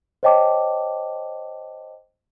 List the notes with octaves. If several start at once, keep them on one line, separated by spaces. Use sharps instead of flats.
C5 C#5 D#5 G5 A5 D6